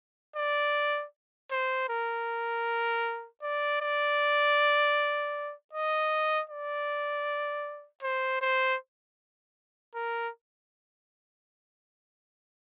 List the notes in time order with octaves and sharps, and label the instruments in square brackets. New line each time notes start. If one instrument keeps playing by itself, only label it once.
[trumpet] D5
C5
A#4
D5
D5
D#5
D5
C5
C5
A#4